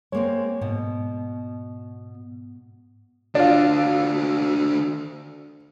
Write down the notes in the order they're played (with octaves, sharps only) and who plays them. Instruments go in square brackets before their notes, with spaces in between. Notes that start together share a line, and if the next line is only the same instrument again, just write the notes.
[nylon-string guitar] G#3 A#3 C4 [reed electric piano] C#5
[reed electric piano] G#2 [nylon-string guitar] B2
[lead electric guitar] D3 F#4 [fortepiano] D4 F4